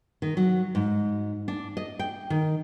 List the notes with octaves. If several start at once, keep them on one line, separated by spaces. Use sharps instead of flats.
D#3
F#3
G#2
D4
D#5
G5
D#3